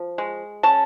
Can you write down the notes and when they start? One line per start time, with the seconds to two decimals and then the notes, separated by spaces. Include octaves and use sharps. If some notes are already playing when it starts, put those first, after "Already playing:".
Already playing: F3
0.18 G#3
0.63 C#4 A5